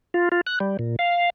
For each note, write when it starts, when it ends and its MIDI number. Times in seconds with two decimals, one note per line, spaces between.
0.14 0.29 65
0.32 0.41 65
0.47 0.59 90
0.60 0.77 55
0.79 0.96 46
0.99 1.30 77